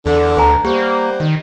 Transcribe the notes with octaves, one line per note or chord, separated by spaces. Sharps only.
E2 D3
D2 B4 G#5 A#5
G3 A#3 G4 C5 F#5
D#3